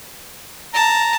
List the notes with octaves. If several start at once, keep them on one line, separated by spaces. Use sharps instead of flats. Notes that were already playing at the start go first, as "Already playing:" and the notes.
A5 A#5